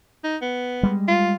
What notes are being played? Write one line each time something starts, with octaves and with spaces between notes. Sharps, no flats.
D#4
B3
G3 G#3
F4